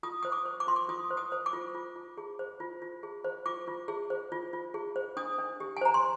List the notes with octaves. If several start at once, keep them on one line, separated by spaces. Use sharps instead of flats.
F4 D#6
C5 D#6
D6
C5
D6
F4 C6
D6
F4 D#6
C5
D#6
C5
D6
F4
F4
F4
G#4
C5
F4
F4
G#4
C5
F4 D6
F4
G#4
C5
F4
F4
G#4
C5
D4 D#6
D4
G4
G#5
C5 A#5
C6